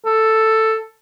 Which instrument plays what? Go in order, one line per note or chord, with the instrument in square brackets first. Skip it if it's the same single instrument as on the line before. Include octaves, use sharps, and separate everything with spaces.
[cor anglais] A4